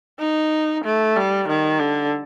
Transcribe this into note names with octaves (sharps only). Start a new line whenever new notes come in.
D#4
A3
G3
D#3
D3